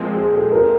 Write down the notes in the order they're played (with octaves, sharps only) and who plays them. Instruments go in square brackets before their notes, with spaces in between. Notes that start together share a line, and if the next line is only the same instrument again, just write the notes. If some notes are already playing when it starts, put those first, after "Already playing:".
Already playing: [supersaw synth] A#2 F3 G#3 C4
[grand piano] G#4
A4
A#4